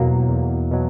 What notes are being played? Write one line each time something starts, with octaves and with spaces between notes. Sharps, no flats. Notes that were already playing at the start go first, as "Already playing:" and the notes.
Already playing: E2 B2 F#3 A#3
E2
B2 F#3